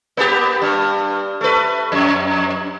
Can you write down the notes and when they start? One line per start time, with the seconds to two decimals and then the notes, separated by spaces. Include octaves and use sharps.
0.17 A#3 B3 G4
0.62 G2
1.41 A3 B4
1.92 F2